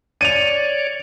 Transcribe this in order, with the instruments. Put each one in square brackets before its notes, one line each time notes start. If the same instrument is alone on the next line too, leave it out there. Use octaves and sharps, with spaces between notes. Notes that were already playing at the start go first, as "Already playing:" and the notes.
[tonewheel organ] C#5 D5 [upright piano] D#7 F7